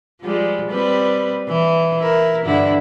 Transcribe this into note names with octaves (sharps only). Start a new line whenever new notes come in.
F3 G3 G#3
G3 C4 B4
E3
E4 A#4
G2 D3 E4